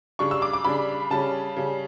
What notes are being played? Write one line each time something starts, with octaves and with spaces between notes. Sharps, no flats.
C#3 G3 D4 C#6
E6
D6
D6
C#3 G3 D4 B5
C#3 G3 C#4 A5
C#3 G3 C#4